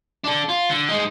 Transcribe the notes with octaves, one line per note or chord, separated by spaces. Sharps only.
D4 A4
F4
D3
G#3 D#4